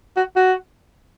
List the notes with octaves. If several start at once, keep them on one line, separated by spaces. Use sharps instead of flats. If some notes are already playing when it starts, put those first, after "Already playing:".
F#4
F#4